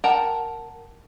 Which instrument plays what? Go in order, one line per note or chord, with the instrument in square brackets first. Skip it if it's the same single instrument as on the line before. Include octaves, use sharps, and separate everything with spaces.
[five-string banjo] A#4 F#5 G5 A5 A#5